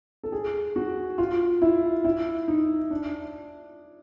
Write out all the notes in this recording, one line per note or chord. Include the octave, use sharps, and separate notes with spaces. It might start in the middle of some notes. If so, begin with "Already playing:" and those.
A4
G#4
F#4
F4
E4
E4
D#4
D4